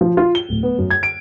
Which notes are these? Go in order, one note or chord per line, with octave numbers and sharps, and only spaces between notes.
F3
F4
G7
D1
B3
F#2
G#6
D7